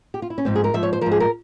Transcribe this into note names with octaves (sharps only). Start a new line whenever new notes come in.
G4
F4
E4
C#4
G#2 F3 C4
G#4
A#4
G#2 F3 E5
C#5
C5
G#2 F3 A#4
G#4
A#4